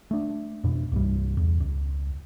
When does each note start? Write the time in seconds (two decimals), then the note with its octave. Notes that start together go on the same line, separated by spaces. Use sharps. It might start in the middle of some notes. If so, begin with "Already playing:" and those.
0.11 A3 D4
0.64 F2 B2
0.92 C2 G2 G3
1.37 E2
1.60 C#2